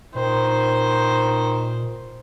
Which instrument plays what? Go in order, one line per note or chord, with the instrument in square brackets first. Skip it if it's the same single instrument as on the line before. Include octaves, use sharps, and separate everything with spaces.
[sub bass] A#2 [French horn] D#3 [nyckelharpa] C5